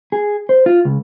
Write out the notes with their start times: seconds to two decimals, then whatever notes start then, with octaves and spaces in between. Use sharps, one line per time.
0.12 G#4
0.49 C5
0.66 F4
0.85 C#2